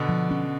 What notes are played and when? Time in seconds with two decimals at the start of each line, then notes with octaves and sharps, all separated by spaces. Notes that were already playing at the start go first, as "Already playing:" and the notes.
Already playing: B2 D3
0.09 F3
0.31 C#4